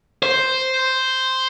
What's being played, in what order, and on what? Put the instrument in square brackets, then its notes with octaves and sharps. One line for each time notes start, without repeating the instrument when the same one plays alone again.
[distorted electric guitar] C5